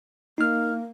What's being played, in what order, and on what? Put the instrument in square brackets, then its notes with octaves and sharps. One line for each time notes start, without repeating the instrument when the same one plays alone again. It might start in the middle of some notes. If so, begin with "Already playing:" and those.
[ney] A#3 [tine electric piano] D#4 F6